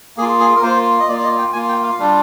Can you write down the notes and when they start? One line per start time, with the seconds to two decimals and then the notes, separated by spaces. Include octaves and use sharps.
0.17 A#3 G#4
0.22 F4
0.40 G#4
0.56 A#4
0.62 A#3 F4 C5
1.00 D#5
1.08 A#3 F4 D5
1.19 D5
1.23 D#5
1.38 G5
1.53 A#3 F4 G#5
1.69 G5
1.83 F5
1.99 G3 D4 F4